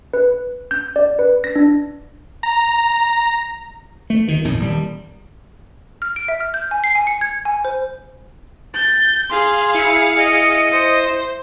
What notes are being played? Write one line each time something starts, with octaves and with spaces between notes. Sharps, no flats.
B4
G6
D5
B4
A#6
D4
A#5
A3
D2 D#3
A#1 F2 A2 D#3
D#1 G3
F6
D7
E5
F6
G6
G#5
C7
G#5
C#7
G#6
G#5
C5
G6 A6
G#4 F5 C6
E4 C#7
D#5
C5